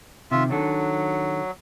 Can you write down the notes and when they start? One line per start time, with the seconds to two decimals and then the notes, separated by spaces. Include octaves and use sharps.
0.31 C3 D#3 F4 E5
0.50 D#3 F#3 D4 A4